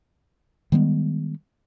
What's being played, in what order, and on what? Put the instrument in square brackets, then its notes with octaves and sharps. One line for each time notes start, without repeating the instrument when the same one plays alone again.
[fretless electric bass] D#3 G3 G#3 B3